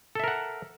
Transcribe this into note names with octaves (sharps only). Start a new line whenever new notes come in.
A4 A#4 E5 F#5